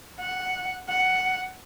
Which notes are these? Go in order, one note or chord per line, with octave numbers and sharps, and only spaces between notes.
F#5
F#5